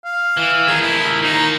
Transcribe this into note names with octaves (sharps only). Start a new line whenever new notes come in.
F5
E3
D#3 F3 G#4
E4
D#3 A#3 D#4